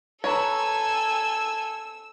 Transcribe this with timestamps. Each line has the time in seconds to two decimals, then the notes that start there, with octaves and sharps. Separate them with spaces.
0.24 A4 B4 C#5 G#5 A#5 B5 E6